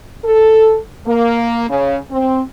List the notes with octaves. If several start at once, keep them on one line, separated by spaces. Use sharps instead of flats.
A4
A#3
C#3
C4